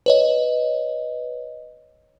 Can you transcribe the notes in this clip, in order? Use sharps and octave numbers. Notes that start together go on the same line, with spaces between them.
B4 C#5 D#5